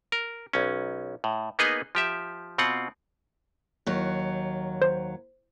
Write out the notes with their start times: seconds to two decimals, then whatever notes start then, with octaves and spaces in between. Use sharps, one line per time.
0.12 A#4
0.53 B1 C#4
1.24 A2
1.59 A#3 B3 D#4 G#4 B4 D#5
1.95 F3 G4 E5
2.58 B2 C4 F4 F#5
3.86 D#2 F#3
4.82 C5